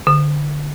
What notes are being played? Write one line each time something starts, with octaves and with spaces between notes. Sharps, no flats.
D3